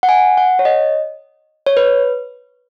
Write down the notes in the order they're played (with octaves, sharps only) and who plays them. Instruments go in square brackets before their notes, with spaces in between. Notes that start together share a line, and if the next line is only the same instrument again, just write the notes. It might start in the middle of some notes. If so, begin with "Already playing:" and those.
[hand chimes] F#5
G#5
F#5
C#5
D#5
C#5
B4